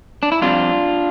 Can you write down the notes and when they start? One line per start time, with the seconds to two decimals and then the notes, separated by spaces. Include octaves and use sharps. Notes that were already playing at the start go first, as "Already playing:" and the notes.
0.23 D4
0.32 E4
0.41 F2 C3 G3 D4 F4